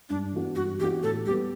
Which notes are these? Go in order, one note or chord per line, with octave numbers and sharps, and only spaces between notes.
G2 D4
E3 B3 D4 F#4
G2 F#4
E3 B3 D4 F#4 G4
A2 A4
G3 B3 G4